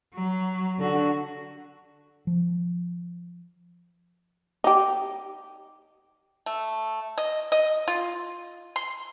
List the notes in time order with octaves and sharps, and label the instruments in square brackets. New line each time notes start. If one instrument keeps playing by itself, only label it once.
[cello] F#3
D3 F#4
[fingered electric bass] F3
[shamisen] D#4 G4
[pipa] A3
D#5
D#5
F4
C6